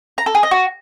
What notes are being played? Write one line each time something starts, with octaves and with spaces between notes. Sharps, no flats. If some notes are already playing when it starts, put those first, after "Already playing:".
A#5
A4
G#4
D#5
F#4